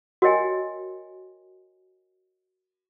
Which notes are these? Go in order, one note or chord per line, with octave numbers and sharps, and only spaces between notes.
F#4 A#4 C#5 D#5 G5 G#5